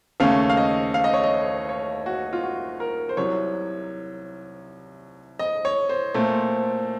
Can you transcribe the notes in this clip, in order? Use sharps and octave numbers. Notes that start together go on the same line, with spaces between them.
D#2 C#3 A3 C#4 F5
F5
D#5
F5
D#5
C#5
D#5
C#5
F#4
F4
F#4
A#4
C5
C2 C3 F#3 C#5
D#5
C#5
C5
A#2 A3 C4